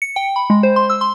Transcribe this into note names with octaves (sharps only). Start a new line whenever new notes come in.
C#7
G5
B5
G#3
C5
C6
E6
C6